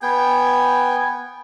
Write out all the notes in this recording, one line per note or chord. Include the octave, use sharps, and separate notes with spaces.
B3 G5 G#5